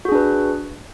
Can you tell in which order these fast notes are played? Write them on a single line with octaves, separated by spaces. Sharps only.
F#4 G#4 D4 B4